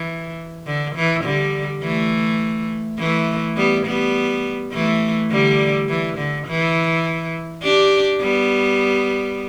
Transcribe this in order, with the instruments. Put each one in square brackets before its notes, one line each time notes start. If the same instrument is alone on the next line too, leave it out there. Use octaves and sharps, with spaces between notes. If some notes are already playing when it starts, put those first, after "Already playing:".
Already playing: [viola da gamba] E3
D3
E3
D3 G3
E3 A3
E3 A3
G3 B3
G3 B3
E3 A3
D3 G3
E3
D3
E3
D4 G4
G3 B3